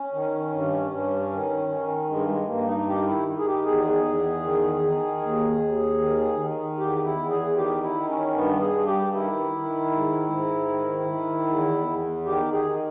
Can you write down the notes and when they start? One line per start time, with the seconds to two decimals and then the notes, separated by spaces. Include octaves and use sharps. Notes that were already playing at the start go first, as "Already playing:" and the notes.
Already playing: C#4
0.13 D#3
0.52 G2
0.91 G2
1.31 D#3
1.69 D#3
2.09 G2 G#3
2.28 G#3
2.48 G2 A#3
2.67 D#4
2.87 D#3 G4
3.06 E4
3.26 D#3
3.38 G#4
3.46 G4
3.65 E2 G#4
4.05 E2
4.43 D#3
4.83 D#3
5.22 D#2
5.60 D#2
6.00 D#3
6.40 D#3
6.78 E2 G4
7.04 E4
7.17 E2
7.30 G#4
7.56 D#3 G4
7.83 E4
7.96 D#3
8.08 C#4
8.34 G2 B3
8.61 G#4
8.74 G2
8.87 G4
9.12 D#3 E4
9.52 D#3
9.91 G#2
10.30 G#2
10.69 D#3
11.08 D#3
11.47 E2
11.87 E2
12.25 D#3 G4
12.52 G#4
12.65 D#3